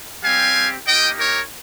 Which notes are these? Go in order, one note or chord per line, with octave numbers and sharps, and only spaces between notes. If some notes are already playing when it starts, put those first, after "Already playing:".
G3 C4 G4 F5 G#5
A#3 D#4 G4 D#5 G5
A#4 C#5